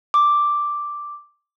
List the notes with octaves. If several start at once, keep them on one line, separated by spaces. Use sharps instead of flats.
D6